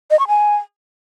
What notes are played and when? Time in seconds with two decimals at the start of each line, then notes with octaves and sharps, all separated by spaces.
0.11 D#5
0.19 C#6
0.28 G#5